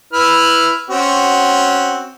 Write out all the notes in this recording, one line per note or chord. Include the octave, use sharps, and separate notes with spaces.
E4 B4 F6
C4 C#4 F#4